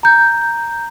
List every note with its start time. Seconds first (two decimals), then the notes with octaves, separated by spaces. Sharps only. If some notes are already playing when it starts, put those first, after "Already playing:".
0.03 A#5 G6